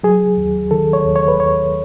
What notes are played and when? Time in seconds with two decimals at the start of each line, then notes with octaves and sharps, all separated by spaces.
0.04 F#3 G#4
0.38 D#2
0.71 D#3 A4
0.93 C#5
1.04 D#2
1.16 C#5
1.28 B4
1.38 D#2 C#5